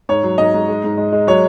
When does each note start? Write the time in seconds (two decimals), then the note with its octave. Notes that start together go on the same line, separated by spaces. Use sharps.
0.09 G#2 C#5
0.23 F#3
0.38 G#2 D#5
0.54 G#2
0.68 G#3
0.84 G#2
0.97 G#3
1.12 G#3
1.27 F#3 C#5